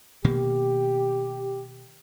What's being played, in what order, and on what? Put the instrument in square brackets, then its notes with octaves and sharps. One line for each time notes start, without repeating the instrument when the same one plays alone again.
[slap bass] B2 D#3 A#3 [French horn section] G4